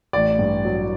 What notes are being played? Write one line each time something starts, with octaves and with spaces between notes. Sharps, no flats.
A1 D5
G2
F#3